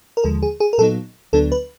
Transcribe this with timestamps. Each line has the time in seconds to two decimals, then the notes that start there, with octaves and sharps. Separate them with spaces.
0.17 A#4
0.24 D#2 D3 F3 G#3 A4
0.42 G#4
0.60 G#4
0.73 A#4
0.78 A#2 F#3 B3 D#4 A4
1.33 D2 D3 F#3 B3 D4 A4
1.52 B4